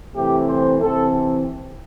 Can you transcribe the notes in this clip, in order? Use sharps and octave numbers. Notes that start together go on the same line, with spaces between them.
C3 E3 A3 C4 G4
C5
C3 E3 C4 A4